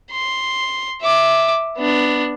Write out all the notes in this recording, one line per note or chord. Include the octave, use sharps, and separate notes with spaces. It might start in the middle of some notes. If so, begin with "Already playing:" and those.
C6
E5 D6
B3 D4